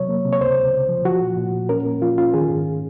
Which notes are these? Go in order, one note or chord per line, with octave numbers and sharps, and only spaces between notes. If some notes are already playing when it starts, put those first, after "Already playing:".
Already playing: C3 F#3 C#5
A#3
C3
C#5
C#2 C5
C#2
C#2
F3
F3 F#4
A#2
A#2
A#2
C#4 A#4
A#3
F3 F4
C#4 F4
D#3 G#4
G#2